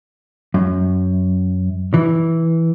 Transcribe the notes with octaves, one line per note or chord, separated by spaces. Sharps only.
F#2
E3